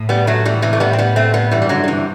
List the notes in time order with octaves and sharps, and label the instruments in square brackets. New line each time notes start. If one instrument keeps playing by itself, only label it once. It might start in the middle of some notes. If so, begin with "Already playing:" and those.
Already playing: [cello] A2
[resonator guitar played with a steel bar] G3 B3
F#3 A3
E3 G3
C3 E3
A3
[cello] A2 [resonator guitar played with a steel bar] G3 B3
[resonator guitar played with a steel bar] C4
G3 B3
A3 C4
G3 B3
[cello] G2 [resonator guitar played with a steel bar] E3 G3
[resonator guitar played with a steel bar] G3
D3 F#3
D3
C3 E3